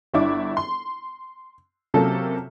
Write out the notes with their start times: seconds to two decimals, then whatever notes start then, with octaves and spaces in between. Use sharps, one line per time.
0.14 G1 D4 E4 D6
0.57 C6
1.94 C3 F#3 A#3 C#4 F4 A4